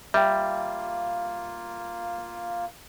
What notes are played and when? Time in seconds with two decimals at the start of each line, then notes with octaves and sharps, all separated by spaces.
0.14 G3 A#3 F4 E5 G5